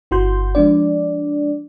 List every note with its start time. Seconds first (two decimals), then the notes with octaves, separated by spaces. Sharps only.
0.11 G1 E4 F#4 C6 G6
0.55 F3 G#3 D4 D5